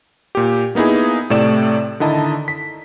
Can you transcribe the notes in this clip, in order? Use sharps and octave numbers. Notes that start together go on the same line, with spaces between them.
A#2 G4
A#3 B3 D#4 E4 G#4
A2 C3 A3 D5 E7
D3 D#3 E4 D#5 A5 A#5
B6